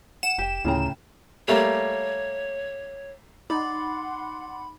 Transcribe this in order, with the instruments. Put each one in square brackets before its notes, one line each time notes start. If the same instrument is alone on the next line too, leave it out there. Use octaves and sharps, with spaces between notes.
[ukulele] F#5 [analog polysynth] E7
[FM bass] F1 [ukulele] G4 G5
[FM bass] D2 [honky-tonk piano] A2 C#3 G5 [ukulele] F4 A#5
[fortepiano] G3 A3 A#3 [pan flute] C#5
[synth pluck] D#4 [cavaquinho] D5 [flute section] F#5 C6 [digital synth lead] B5